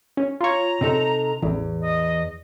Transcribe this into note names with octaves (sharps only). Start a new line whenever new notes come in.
C#4
F4 C#5 A#5
C3 D#4 A4
A1 E2
D#5